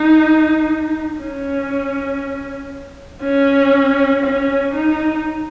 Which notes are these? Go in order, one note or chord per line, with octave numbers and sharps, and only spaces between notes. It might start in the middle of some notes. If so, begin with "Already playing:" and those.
Already playing: D#4
C#4
C#4
C#4
D#4